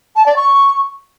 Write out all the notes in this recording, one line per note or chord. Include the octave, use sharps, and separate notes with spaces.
A5
D5
C#6